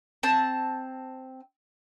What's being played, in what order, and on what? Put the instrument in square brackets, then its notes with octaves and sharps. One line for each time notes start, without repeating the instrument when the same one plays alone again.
[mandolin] C4 A5